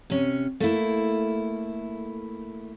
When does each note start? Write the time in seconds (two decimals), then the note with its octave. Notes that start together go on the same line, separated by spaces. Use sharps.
0.10 C3 C#4
0.60 A3 A#3 E4